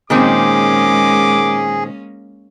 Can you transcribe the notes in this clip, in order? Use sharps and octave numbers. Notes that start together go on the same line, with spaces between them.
A#2 D#3 G#3 A#3 C4 C#4 G#4 D6